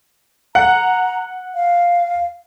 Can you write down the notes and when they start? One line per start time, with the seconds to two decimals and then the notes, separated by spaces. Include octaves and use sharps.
0.55 F#5 A#5
1.55 F5